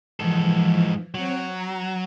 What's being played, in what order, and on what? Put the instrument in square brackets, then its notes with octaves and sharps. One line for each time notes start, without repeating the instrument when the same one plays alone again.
[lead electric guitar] G#2 A4 [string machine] E3 F3
[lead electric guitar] F#3 [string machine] C4 C#5 G5
[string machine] A#5